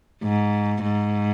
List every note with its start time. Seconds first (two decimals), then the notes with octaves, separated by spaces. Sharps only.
0.23 G#2
0.83 G#2